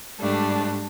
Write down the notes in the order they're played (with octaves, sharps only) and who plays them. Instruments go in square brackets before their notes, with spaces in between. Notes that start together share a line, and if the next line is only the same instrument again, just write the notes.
[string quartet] G#2 G3 A3 D4